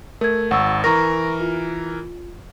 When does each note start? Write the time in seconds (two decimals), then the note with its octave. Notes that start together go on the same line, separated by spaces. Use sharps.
0.21 A3 A#4 G#6
0.51 G#1 F#5 C#6 E6
0.84 E3 A#4 A#5 C#6 A#6
1.41 F4